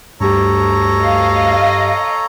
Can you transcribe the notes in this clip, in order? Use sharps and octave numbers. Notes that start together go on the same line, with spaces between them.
D2 G2 G4 A4 C#5 A#5
D#5 F5